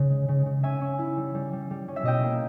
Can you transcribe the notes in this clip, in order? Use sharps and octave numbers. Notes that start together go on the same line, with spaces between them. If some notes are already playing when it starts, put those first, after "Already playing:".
Already playing: C#3
G#3
C#3
C#3
C#4 E5 G#5
C#4
E4
G3
G3
G3
G3
C#4
E5
B2 D#5 G5
A#3